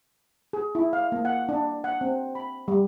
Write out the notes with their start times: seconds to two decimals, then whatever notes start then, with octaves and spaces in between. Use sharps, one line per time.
0.53 G#4
0.75 E4
0.93 F5
1.12 A#3
1.25 F#5
1.49 D4
1.84 F#5
2.01 C4
2.35 B5
2.68 G3